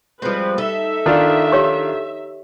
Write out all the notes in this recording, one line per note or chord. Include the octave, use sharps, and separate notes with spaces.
F3 G3 G#3 C4 B4
D#4 A4 E5
D#3 D4 F4
G4 C#5 C#6